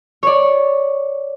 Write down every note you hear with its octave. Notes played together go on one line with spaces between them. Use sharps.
C#5 D5